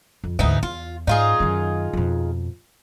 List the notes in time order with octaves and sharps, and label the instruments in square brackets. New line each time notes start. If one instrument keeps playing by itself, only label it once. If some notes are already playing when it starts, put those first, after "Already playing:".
[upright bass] F2
[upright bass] D2 G#2 [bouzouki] E3 B3 D#4
[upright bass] E2 [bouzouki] F4
[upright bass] G#2 [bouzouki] D#4 F4 G#4
[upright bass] F#2 D#3
F2 B2